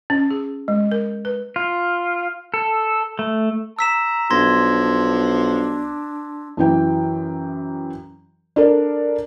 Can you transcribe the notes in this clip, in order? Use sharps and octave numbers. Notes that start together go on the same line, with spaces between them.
C#4
G#4
G#3
A#4
B4
F4
A4
A3
A#5 E6 B6 E7
B1 F3 D4 C6 G#6 A#6
F#2 E3 G5
D4 A4 A#4 D5